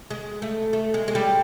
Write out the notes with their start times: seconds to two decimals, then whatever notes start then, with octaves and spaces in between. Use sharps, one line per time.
0.10 G#3
0.42 A3
0.73 A3
0.94 G#3
1.08 G#3
1.15 G3